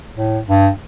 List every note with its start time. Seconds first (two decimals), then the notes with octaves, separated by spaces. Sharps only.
0.17 A2
0.47 G2